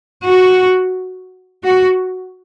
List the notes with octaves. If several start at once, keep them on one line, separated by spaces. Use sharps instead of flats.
F#4
F#4